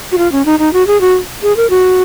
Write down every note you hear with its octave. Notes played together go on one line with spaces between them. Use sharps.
F#4
F4
C#4
D#4
D#4
F#4
G#4
F#4
G#4
A#4
F#4